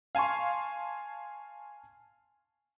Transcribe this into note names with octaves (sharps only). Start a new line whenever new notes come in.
F5 G#5 A5 C6 C#6